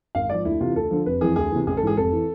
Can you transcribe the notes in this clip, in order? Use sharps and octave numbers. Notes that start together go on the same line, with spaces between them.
G#1 F5
G#2 F3 D5
D2 E4
C3 E3 F4
D2 A4
D3 F3
F1 B4
F2 E3 G#4
D2 G#4
C3 E3
A1 G#4
A4
G#2 E3 G#4
F1 A4
E3